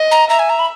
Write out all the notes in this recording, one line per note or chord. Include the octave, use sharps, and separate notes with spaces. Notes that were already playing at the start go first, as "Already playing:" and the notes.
Already playing: D#5
A#5
E5 A#5
G#5
A#5
B5